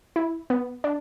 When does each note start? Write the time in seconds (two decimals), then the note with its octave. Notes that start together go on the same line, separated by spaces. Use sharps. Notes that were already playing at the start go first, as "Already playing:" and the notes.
0.16 E4
0.50 B3
0.84 D4